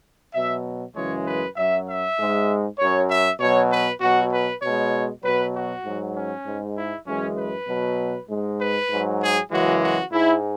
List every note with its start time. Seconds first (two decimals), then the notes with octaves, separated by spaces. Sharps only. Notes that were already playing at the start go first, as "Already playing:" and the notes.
0.34 B2 F#3 E5
0.95 F#2 C#3 E3 G#3 C#5
1.26 B4
1.56 F#2 F#3 E5
1.87 E5
2.18 G#2 G#3
2.79 F#2 F#3 C#5
3.09 E5
3.40 B2 F#3 C#5
3.70 B4
4.01 B2 F#3 F#4
4.31 B4
4.62 B2 G#3 C#5
5.23 B2 F#3 B4
5.54 F#4
5.84 G#2 F#3
6.15 C#4
6.45 G#2 G#3
6.76 E4
7.07 F#2 E3 G#3 C#4
7.37 B4
7.68 B2 F#3
8.29 G#2 G#3
8.59 B4
8.89 G#2 F#3
9.21 G#4
9.51 F#2 C#3 E3 G#3 F#4
9.82 F#4
10.12 G#2 G#3 E4